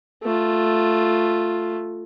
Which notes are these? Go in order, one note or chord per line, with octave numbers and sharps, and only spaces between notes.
A3 F4